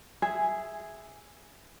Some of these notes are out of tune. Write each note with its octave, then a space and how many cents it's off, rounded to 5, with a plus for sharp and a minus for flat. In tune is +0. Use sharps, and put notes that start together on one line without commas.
G#4 +0 E5 +0